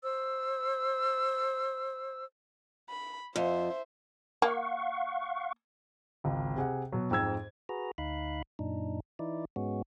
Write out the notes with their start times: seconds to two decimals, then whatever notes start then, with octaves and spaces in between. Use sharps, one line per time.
0.03 C5 E6
2.89 B5
3.36 F2 C5 E5
4.42 A#3 F5 F#5 C#6
6.24 G#1 C#2
6.56 C3 G#4 F#5
6.92 B2 F#3
7.11 F2 G#2 E6 G#6
7.69 F#4 G#4 B4 A#5
7.98 D2 D#4 F5 B5 F#6
8.59 F#2 A#2 D4 D#4
9.19 E3 D#4 E4 D5
9.56 G#2 G#3 B3 C#4 F#4